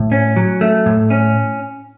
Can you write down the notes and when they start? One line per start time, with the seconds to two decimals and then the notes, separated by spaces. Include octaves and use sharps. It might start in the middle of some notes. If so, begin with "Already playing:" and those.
Already playing: A2
0.12 C#4
0.36 F#3
0.61 A3
0.86 A2
1.10 C#4